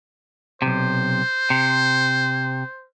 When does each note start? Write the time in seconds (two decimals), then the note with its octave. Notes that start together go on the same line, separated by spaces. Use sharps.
0.62 B1 E2 C3 C5
1.50 C3